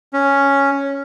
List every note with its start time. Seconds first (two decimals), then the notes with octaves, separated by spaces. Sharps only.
0.13 C#4